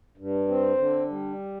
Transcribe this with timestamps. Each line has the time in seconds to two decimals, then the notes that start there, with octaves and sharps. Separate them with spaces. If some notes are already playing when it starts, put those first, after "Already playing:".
0.18 G2
0.48 C4
0.77 D3
1.09 G3